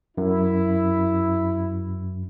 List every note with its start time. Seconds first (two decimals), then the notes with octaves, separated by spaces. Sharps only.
0.18 F#2 E4